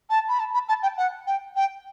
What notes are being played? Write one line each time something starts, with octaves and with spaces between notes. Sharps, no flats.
A5
B5
A5
B5
A5
G5
F#5
G5
G5